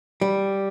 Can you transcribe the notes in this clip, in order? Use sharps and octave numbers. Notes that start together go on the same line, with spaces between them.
G3